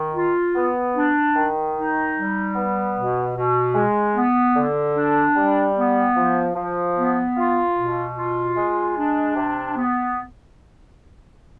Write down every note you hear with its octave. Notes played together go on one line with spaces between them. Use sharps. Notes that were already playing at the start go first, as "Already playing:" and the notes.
Already playing: D#3
F4
B3
D4
D#3
D#4
G3
B3
B2
B2
G#3
B3
D3
D4
G3
B3
F3
F3
B3
F4
B2
F4
G#3
D4
C3
B3